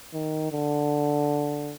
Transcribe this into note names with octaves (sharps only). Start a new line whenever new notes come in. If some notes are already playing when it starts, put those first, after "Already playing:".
D#3
D3